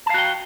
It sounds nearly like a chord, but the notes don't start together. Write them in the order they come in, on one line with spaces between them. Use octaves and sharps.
A5 F5 F#4 G5